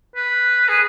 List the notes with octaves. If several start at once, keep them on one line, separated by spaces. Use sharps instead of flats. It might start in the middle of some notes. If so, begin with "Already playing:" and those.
B4
G#4